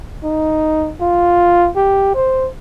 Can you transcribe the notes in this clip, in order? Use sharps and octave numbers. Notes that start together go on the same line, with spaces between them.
D#4
F4
G4
C5